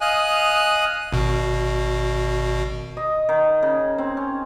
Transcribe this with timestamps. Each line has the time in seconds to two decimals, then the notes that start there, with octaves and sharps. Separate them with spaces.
0.01 D#5 F5 G#5 D#6 F#6
1.12 G#1 B2
2.97 D#5
3.29 D#3
3.63 C#3
3.98 C4
4.17 C#4